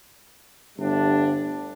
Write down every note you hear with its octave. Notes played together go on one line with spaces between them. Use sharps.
G1 A2 G3 D4